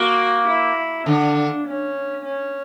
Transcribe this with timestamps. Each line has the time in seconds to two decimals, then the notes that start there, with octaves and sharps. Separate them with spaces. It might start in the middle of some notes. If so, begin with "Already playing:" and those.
Already playing: A#3 F#4
0.47 E4
1.06 D3 D4
1.66 C#4
2.25 C#4